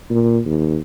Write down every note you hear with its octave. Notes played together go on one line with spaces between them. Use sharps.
A#2
D#2